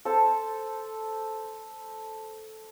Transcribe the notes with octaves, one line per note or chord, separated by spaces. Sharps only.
A4 C5 A5